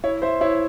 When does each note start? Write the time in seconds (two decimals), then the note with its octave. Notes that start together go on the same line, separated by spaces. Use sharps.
0.04 E4 C#5
0.22 C5 E5
0.41 E4 C#5